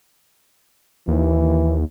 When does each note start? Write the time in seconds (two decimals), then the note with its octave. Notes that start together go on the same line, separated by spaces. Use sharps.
1.08 D#2 E3